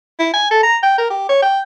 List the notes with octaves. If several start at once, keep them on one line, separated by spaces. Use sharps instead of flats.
E4
G#5
A4
A#5
G5
A#4
G4
C#5
G5